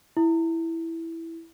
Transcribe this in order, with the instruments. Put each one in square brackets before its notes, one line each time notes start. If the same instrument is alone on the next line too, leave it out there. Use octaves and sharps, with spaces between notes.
[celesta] E4